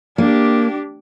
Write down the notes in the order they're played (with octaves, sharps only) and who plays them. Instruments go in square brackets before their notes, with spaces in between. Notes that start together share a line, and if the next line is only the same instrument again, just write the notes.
[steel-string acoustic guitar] A#3 [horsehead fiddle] D4 G4